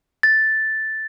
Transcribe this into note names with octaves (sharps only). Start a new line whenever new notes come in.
A6